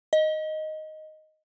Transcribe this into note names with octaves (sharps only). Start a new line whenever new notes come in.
D#5